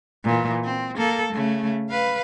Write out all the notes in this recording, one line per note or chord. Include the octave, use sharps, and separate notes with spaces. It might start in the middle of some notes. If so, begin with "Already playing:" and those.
A#2 E3
C4
A#3 A4
C#3 A3
B4 F5